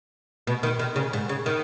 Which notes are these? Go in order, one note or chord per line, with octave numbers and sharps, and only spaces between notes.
B2
D#3
D#3
C#3
G#2
C#3
D#3